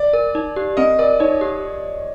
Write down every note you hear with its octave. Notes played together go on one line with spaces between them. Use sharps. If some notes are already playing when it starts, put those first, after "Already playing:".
Already playing: D5
A#4
D#4
G4
C4 D#5
A#4 D5
D#4 C#5
G4